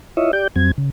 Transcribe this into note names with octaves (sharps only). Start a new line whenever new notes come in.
E4 F4 C#5 D#5 E5
G4 D5 G6
F2 F#3 C4 G#6
C#3